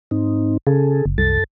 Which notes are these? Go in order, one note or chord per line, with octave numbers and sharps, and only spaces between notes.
G#2 C4 D#4
C#3 G#4 A4
F#1
C2 F#2 A4 A6